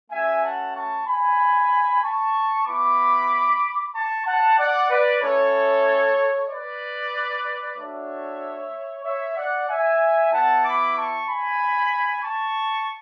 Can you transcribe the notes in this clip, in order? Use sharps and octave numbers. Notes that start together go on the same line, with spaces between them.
A3 C#4 F#4 E5 G#5
F#5 A5
A5 C#6
G#5 B5
A5 C#6
B3 E4 B5 D6
A5 C#6
F#5 A5
D5 F#5
B4 D5
A3 C#4 E4 A4 C#5
B4 D5
A3 D4 F#4 C#5 E5
C#5 E5
D5 F#5
E5 G#5
B3 E4 F#5 A5
B5 D6
A5 C#6
G#5 B5
A5 C#6